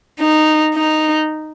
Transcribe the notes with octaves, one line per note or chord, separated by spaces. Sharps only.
D#4
D#4